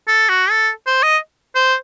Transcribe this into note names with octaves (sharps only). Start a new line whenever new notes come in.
A4
F#4
A4
C5
D#5
C5